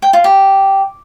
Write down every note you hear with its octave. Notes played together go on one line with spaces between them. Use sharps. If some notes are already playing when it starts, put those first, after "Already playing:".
G5
F4
G4